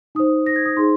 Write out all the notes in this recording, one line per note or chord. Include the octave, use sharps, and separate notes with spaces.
D#4 C5 D#6
A#6
G#6
D#6
D#4 G#4 C5 C6